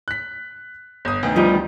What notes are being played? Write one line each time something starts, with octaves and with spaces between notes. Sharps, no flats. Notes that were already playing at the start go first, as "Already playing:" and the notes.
F#6 B6
G1 D#6
D2 D#3 B3
F3 G3 D#4